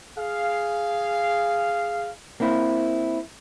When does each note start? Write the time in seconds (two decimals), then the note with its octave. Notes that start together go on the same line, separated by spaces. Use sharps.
0.18 G#4 F5
2.40 A#3 C4 E4